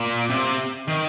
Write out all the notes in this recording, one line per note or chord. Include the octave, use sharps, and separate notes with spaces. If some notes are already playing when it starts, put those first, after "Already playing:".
Already playing: A#2
C3
D#3